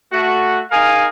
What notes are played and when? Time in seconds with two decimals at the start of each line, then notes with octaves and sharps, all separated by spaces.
0.12 A3 F#4
0.71 D#4 G#4 A#4 F5 G#5